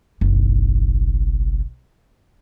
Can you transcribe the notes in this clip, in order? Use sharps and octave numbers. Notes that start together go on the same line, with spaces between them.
F#1 B1